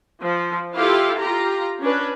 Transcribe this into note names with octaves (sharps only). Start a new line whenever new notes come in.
F3
E4 F4 G4 A4 F5
F4 G4 A#5
C#4 D4 B4